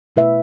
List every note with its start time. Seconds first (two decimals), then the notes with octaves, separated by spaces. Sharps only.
0.16 B2 A3 E4 B4 E5